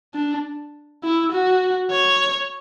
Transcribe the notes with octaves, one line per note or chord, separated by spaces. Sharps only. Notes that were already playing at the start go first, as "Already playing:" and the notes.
D4
E4
F#4
C#5